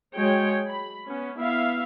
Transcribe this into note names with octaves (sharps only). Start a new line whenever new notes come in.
F#3 G#3 C#5 G5
B5
B3 C#4
B3 E4 E5 F5